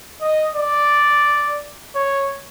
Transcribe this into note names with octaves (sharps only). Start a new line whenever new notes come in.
D#5
D5
C#5